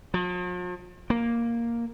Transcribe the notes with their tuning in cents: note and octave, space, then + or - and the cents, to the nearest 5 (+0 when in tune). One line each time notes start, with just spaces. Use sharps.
F3 +45
A#3 +0